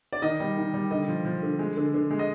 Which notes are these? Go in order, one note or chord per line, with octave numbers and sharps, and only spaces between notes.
D5
D#3 D#5
G3
D#3
G3
D3 D#5
F3
F3
D3
G#3
D3
D3
G#3
D#5